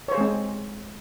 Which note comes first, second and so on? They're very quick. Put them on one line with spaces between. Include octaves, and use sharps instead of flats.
C#5 C5 G#4 G#3 C4